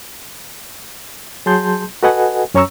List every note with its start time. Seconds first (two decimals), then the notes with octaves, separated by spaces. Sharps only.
1.46 F#3 G#4 A5 C6 G6
2.03 F#4 A4 B4 D#5 F#5 G#5
2.54 F#2 C#4 C#5 A#5 C#6 E6